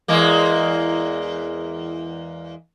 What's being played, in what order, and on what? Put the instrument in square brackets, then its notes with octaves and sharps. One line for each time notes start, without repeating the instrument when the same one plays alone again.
[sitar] E2 G#3 A#3